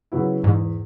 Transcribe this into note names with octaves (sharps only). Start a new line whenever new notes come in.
C#3 F#3 B3 E4
E2 G#2